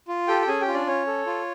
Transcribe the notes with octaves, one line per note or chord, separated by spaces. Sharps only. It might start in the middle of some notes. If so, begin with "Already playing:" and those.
F4
G4 A4 G5
G5
C#4 G#4 G#5
G4 G5
F4
D4 D5
C#4 C#5
A4
F4